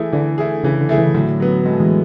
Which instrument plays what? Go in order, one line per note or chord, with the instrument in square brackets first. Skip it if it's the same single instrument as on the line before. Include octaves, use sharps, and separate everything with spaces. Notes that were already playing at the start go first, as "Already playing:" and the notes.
Already playing: [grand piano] E3 A3 E4 G#4
[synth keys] D3 [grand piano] E3
[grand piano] A3 E4 G#4
[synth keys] C#3 [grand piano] E3
[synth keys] D3
[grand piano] A3 E4 G#4
[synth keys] C#3 E3
[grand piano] A2 [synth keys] D3 F#3
[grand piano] F#3 B3
[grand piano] A2 [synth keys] G#3
[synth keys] A3
E3 G#3